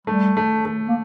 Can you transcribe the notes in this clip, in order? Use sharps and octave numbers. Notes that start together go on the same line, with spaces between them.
G3 A3
A3
A3
A#3